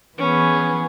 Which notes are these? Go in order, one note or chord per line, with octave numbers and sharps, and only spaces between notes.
E3 B3 C#4 G#4